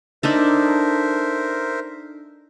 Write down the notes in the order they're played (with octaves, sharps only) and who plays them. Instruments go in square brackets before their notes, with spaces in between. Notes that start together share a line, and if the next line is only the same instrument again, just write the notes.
[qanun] D4 D#4 A4 [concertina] A#4 C5 E5